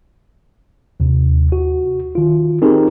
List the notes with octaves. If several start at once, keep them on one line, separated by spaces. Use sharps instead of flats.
D#2 C3
F#4
D#3 F4
C4 D#4 G4 G#4 A#4